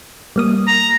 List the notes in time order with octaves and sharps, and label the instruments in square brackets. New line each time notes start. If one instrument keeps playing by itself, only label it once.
[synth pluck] G3 A#3 D#6
[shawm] A#5